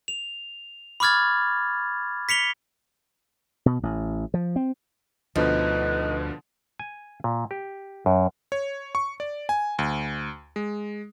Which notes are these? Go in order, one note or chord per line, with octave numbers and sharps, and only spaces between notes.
F7
B5 C#6 D6 F6 G#6 A6
B6 C#7 F7 G7
B2
A1
F3
C4
D2 B2 D3 F3 D#4 B4
G#5
A#2
G4
F#2
C#5
C#6
D5
G#5
D2
G#3